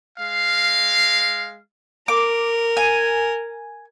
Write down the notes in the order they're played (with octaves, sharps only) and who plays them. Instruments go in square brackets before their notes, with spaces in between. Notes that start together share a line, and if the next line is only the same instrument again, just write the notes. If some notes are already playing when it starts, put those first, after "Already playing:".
[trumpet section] G#3 F5
[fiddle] A#4 [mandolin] D6
[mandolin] G#5